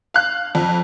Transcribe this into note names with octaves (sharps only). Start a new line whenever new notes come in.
F5 F#6
F2